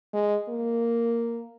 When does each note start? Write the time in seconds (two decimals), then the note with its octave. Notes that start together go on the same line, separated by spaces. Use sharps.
0.14 G#3
0.49 A#3